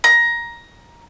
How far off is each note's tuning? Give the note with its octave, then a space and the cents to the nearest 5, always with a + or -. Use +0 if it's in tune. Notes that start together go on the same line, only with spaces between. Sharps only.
A#5 +15